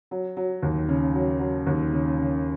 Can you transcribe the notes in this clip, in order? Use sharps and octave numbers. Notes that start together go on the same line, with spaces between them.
F#3
F#3
D#2
C#3
F#3
F#3
D#2
C#3
C#3